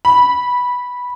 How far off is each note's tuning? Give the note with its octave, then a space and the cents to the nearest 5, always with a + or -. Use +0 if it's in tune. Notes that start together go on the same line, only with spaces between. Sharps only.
B5 -15